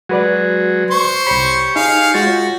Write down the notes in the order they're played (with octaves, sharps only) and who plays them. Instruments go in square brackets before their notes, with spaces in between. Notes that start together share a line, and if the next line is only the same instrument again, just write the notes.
[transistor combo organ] F#3 G#3 [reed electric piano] F#4 B4 D5
[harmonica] C5 C#6
[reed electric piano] C2 B5 [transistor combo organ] G4 C#5
[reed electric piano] D#4 [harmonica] G#4 F5
[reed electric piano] G#3 F4 A6 [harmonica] F#4